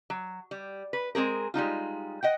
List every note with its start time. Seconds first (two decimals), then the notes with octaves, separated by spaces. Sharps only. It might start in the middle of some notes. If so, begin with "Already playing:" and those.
0.10 F#3
0.51 G3
0.93 B4
1.15 G#3 C4 G#4 A#4
1.54 G3 G#3 D#4 F4
2.23 D#5 F#5 G5